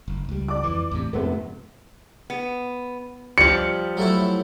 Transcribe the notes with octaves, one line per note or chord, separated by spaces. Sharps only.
F#1
C#2 G3
D5 D6
F2 E3
E2 A2 C3
A#1 F2 G#2 C3 A3 B3
B3
F3 G3 C#7
F#3 A3 E4